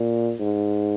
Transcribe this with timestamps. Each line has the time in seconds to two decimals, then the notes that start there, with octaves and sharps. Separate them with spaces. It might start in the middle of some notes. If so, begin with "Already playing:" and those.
Already playing: A#2
0.39 G#2